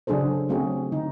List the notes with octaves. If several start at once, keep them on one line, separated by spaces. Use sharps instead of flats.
C#3 F#3 D4 G#4 A4 C5
F#3 A3 C4 C#4 F#4 G#4
D3 D#4